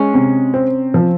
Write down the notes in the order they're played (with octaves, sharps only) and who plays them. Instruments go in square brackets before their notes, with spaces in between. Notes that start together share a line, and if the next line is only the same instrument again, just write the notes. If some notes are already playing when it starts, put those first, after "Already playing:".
Already playing: [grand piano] G#3 [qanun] C#4
[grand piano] C3
C4
F3